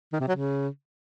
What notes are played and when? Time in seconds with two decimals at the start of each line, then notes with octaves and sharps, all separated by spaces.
0.13 D#3
0.20 C3
0.28 F#3
0.36 C#3